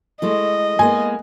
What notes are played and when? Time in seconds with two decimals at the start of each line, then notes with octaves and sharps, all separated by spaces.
0.22 G#3 A3 E4 D#5
0.79 G#3 A#3 B3 G#5